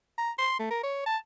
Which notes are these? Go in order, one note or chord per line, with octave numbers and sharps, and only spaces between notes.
A#5
C6
A3
A#4
C#5
A5